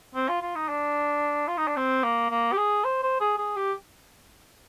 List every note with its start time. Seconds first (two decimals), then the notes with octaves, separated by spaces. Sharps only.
0.15 C4
0.29 F4
0.42 F4
0.56 D#4
0.69 D4
1.48 F4
1.57 D#4
1.67 D4
1.76 C4
2.04 A#3
2.31 A#3
2.52 G4
2.57 G#4
2.84 C5
3.03 C5
3.20 G#4
3.38 G#4
3.56 G4